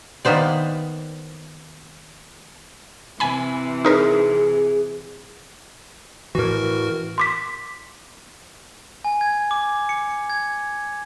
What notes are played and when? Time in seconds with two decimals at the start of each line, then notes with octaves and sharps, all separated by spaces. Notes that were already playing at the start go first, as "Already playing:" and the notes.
0.25 D#3 A#3 B3 C5 D5
3.20 C3 E3 G#5 B5
3.85 D#4 G#4 A#4 B4
6.35 A2 E3 F#4 A#4
7.18 C6 D6 B6
9.05 G#5
9.21 G#6
9.51 D6
9.89 C#7
10.30 G#6